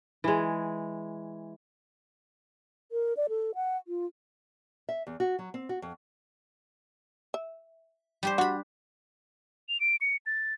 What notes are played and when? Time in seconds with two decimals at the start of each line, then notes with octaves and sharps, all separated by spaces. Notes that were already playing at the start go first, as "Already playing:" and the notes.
0.24 E3 G#3
2.92 A#4
3.17 D5
3.29 A4
3.55 F#5
3.88 F4
4.89 E5
5.07 E2
5.20 F#4
5.39 F#3
5.54 C4
5.69 F#4
5.82 F2
7.34 E5
8.23 G3 G4 C5
8.38 D4 F#4 B5
9.69 F7
9.81 D7
10.01 C#7
10.26 A6